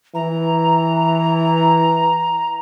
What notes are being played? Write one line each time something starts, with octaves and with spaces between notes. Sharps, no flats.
E3 A#5